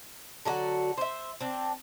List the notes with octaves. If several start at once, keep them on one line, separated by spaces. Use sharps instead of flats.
D3 F#3 F#4
C5 E5
C4 D4